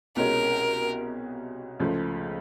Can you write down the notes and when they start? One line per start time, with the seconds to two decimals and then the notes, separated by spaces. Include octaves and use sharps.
0.16 C2 B2 G#3 C#4 A#4
1.80 C#2 C#3 F3 A3